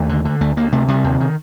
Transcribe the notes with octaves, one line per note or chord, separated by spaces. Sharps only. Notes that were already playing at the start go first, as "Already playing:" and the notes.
Already playing: D#2 A3
D3
D3
D2 A3
D2 A#3
C3 A3
C3 G3
D#2 D#3
D#3